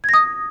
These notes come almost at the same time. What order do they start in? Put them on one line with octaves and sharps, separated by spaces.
G#6 A#6 D#6